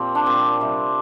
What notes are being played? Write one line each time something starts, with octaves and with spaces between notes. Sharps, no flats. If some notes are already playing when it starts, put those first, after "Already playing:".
Already playing: A#2 F3 C4 G4
D4
A#2 G3 C4
C3 G3